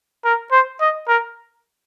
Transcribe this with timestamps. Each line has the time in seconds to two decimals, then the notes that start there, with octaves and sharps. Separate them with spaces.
0.25 A#4
0.52 C5
0.81 D#5
1.08 A#4